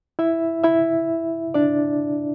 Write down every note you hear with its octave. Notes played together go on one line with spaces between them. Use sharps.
E4 E5
E4 E5
D4 D5